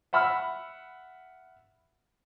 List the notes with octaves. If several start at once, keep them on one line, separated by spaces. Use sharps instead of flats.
E5 F#5 B5 E6 F6